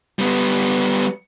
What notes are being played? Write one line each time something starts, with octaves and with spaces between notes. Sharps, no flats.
G3 B3